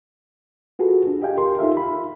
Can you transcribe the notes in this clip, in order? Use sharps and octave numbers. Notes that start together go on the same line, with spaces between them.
F4 F#4 G#4 A4 B4
D4
G4 D#5 F5 G5 G#5
G4 A#4 C6
D#4 F4 A4 E5 F5
B5